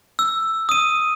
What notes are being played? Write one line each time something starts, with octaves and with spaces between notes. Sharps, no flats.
E6
D#6 D#7